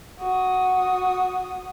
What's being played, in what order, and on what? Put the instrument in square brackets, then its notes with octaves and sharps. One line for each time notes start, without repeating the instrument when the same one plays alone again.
[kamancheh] F#4 D#6